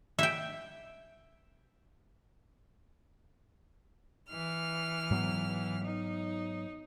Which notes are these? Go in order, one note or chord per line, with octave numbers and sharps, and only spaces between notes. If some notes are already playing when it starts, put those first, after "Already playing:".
E5 G5
E3 F6
G#2 F#3 B3
D#4